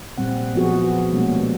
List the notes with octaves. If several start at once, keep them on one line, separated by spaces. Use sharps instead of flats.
A#2 G3 C4 F#5
F3 B3 F4 F#4 G#4
B2 G3 G#3 A#3 C#4